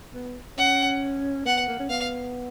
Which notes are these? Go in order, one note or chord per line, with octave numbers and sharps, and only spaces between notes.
B3
C#4 F#5
B3 F#5
A#3
C#4
B3 F5